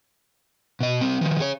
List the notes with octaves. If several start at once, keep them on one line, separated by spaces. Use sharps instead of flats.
B2 D#5
G3 C4
D#3 F3
G#4 C#5